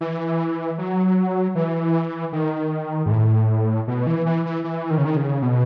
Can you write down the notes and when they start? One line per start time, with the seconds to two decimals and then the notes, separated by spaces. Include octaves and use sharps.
0.01 E3
0.78 F#3
1.55 E3
2.33 D#3
3.06 G#2
3.11 A2
3.87 B2
4.07 E3
4.26 E3
4.46 E3
4.64 E3
4.90 D#3
4.98 C#3
5.05 D#3
5.17 C#3
5.42 B2